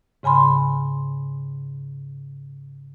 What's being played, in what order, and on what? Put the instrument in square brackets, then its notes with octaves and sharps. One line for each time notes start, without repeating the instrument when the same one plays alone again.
[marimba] G#2 C#3 G#5 B5 C6